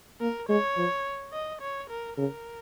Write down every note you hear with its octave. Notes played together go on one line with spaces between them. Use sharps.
A#3 A#4
G#3 C#5
F3
D#5
C#5
A#4
C#3 A#4